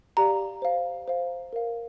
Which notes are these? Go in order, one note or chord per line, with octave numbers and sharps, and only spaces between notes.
G4 D5 F5 A#5
C5 F5
C5 F5
A#4 F5